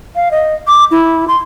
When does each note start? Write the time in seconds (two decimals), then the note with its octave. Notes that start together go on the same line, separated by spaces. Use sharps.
0.16 F5
0.31 D#5
0.67 D6
0.91 E4
1.28 C6